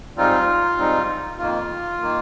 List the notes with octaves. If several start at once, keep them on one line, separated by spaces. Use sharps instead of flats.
G#2 G3 C4 D#4 F4
G#2 G3 C4 D#4
F2 D#3 A#3 F4
D#3 A#3